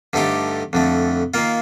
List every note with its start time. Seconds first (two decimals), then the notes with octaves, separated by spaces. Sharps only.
0.13 G2 D3 A3 D#4 G4
0.73 F2 D3 A3
1.34 D#3 A#3 F4